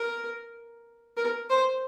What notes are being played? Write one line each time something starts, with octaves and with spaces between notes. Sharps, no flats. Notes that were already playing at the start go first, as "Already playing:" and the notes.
Already playing: A#4
A#4
C5